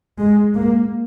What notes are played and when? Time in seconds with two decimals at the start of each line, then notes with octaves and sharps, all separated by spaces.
0.19 G#3
0.55 A#3